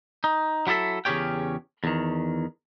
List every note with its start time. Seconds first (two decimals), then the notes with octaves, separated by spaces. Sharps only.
0.24 D#4
0.67 F#3 E4 G4 A4 E5
1.05 E2 C#3 C#4 G4 C#5 G5
1.84 E2 D#3